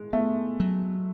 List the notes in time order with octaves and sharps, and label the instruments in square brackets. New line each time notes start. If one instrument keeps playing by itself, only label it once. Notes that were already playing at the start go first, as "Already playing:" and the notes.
Already playing: [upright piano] G#3
[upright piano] A3 [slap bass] B3
[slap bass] F#3